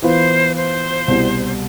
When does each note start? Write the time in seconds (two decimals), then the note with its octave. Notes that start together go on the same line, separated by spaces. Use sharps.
0.02 E3 B3 F4 B4 C5
0.55 C5
1.08 C2 B2 G3